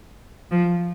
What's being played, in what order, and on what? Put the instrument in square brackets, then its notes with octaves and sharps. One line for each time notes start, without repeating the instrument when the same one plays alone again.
[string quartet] F3